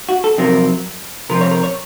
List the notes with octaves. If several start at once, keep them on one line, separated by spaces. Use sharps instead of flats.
F#4
A4
F2 C3 F#3 C4 A#4
C3 F3 C4 A#4
C#5
A#4
C#5